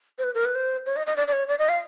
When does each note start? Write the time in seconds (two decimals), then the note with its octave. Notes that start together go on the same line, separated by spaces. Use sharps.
0.18 C5
0.24 B4
0.35 A#4
0.45 B4
0.55 C5
0.86 C#5
0.96 D#5
1.07 D#5
1.17 D5
1.28 D5
1.33 C#5
1.48 D5
1.59 D#5
1.69 F5